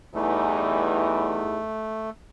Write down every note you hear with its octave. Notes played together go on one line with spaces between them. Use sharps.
E2 E3 G3 A3 D#4